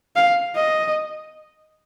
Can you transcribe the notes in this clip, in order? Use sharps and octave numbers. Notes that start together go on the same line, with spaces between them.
F5
D#5